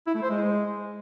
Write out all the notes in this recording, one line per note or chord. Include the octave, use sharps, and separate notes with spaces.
E4
A3
C5
G#3